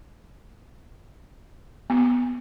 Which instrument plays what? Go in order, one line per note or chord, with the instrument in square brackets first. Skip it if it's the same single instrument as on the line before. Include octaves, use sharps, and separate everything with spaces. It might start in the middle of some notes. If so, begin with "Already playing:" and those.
[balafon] B3